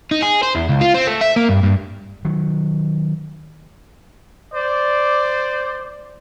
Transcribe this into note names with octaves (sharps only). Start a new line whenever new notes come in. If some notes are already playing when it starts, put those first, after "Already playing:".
D#4
G#4
C5
E2
C#2
F4
C4
A3
E5
A#3
G2
G2
D#3 F#3
C5 D5